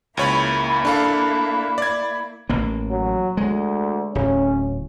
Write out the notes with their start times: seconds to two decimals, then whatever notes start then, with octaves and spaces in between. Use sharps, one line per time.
0.17 C#2 A#3 E4 C#5 B5
0.85 D4 A4 F5
1.78 D5 G#6
2.50 A1 A#3
2.91 F#3
3.37 D2 G#3
4.15 D1 C#4